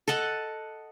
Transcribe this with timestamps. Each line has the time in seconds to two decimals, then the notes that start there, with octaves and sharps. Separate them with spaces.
0.08 A4 D#5 F#5 A5